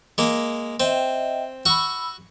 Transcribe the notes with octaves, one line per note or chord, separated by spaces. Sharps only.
G#3 A#3
C4 D#5 E5 G5
F#4 B5 C#6 E6